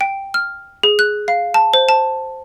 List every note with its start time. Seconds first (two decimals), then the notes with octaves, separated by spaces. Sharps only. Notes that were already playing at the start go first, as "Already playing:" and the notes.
0.01 G5
0.34 F6
0.83 G#4
0.99 F#6
1.28 F5
1.54 A5
1.74 C5
1.89 A5